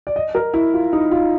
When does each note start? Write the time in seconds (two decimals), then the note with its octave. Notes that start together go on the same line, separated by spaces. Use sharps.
0.07 D5
0.16 D#5
0.35 A#4
0.54 E4
0.74 F4
0.93 D#4
1.11 F4